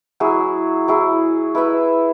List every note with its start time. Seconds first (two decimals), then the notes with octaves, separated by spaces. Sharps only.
0.20 F#3 E4 G#4
0.88 F#3 E4 G#4
1.55 E4 B4 E5